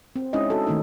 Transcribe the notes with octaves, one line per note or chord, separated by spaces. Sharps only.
C4
G#3 C#4 D#4 E4 D#5
F#4 A4
D#3 A3 D#4